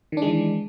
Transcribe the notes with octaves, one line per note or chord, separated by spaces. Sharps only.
D#3 E3 G#3 D4